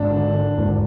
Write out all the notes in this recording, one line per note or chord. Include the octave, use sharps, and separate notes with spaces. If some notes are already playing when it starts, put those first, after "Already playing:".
Already playing: G#1 D4
D3
D3
G#1